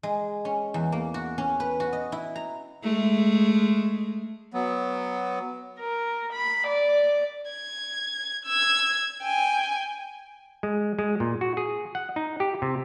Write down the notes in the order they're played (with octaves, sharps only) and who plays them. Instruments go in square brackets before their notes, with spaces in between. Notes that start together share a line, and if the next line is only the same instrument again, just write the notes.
[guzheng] G#3
C#4
E2
A#3
F#4
C#4
B4
F#4
D#5
E4
A#5
[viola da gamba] G#3 A3
[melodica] F#3 B3
[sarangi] A#4
B5
D5
[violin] G#6
E6 G#6
G5 G#5
[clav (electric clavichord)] G#3
G#3
A#2
F#4
G#4
F#5
D#4
G4
C3